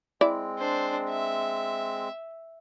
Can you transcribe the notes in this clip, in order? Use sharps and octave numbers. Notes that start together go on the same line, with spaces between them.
G#3 C4 E4 D5
D4 C5
E5